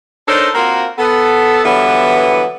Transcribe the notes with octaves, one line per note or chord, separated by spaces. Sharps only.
D4 D#4 A4 A#4 C5 C#5
A#3 C4 F4 F#4 A#4
B3 A4
D3 E3 F#3 G3 B3 E4